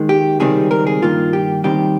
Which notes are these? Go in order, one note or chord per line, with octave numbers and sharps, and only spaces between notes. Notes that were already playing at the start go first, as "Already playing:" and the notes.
Already playing: D#2 D#3 G#3
G4
C#2 C3 D#3 G3 C4 G#4
A#4
G#4
G2 D#3 A#3 F4
G4
D#2 D#3 G3 C4 G4